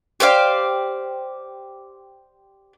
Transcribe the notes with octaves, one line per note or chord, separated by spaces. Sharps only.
G4 C5 D5 F5